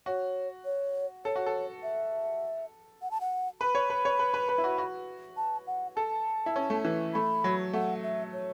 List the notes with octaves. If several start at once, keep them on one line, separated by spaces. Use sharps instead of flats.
F#4 C#5
C#5
A4 C#5
F#4
A4
E5
F#5
A5
F#5
B4 B5
C#5
B4
C#5
B4
B4
B4
E4
F#4
F#4
A5
F#5
A4 A5
E4
C#4
A3
E3
A3 B5
F#3
A3 F#5
E5
C#5